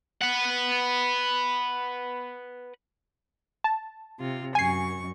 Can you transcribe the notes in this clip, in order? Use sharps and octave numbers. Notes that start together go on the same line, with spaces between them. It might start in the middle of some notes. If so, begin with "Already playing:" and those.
B4 F#5
A5
C3 F4
F#2 G#5 C#6 C7